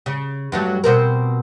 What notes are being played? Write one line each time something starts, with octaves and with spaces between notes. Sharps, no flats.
C#3
G2 F#3 A3
B2 C4 A#4